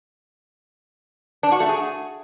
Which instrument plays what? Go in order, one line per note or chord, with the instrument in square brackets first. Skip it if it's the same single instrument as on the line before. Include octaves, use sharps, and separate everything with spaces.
[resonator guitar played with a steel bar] D4
F#4
A3
G#4